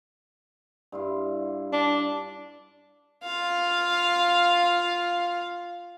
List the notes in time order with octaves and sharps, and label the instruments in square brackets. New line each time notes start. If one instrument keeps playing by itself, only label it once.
[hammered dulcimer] G2 E4 F4
[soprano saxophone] D4
[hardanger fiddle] F4 F5